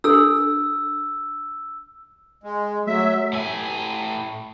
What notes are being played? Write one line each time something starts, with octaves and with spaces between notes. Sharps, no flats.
D4 A4 E6
G#3
F#3 A3 E5
A2 G#5